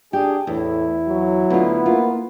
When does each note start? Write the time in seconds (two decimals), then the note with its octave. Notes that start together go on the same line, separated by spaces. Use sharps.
0.13 D4 G4 G#4
0.47 E2 A2 E4
1.08 F#3
1.50 D2 B3 F4
1.86 A#3 F4